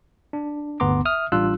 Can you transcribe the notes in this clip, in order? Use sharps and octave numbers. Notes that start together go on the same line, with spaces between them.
D4
G1 D2 B3 A#5 C6 D6
E5 D#6 F6
A1 G3 D4 F4 E6 F#6